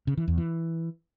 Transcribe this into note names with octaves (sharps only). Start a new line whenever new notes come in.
C#3
E3
E2
E3